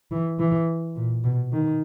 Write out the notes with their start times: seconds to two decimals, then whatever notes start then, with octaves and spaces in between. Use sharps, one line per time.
0.11 E3
0.39 E3
0.96 A#2
1.24 B2
1.52 D#3